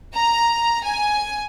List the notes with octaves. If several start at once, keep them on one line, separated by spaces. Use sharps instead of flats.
A#5
G#5